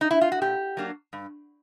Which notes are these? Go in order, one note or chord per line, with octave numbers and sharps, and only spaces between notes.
D#4
E4
F4
F#4
A#2 G4
F#3 A#3 D4
G2